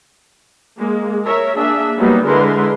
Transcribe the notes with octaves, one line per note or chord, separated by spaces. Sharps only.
G#3 A#3
A#4 C#5 E5
A#3 D4 G#4 E5
F#3 G3 A#3 B3 D#4
D3 G#3 E4 A#4 B4 C6